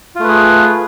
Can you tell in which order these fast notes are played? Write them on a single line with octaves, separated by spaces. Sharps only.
F4 A3 B4 G#4